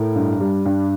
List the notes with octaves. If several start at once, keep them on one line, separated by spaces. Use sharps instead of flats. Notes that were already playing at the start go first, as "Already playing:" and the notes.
Already playing: A2 A#4
G2
G3
G2